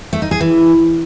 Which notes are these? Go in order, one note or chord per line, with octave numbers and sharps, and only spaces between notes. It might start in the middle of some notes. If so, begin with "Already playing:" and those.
A3
D#4
G#4
E3